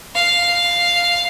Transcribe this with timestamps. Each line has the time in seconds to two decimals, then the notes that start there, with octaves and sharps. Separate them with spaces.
0.15 F5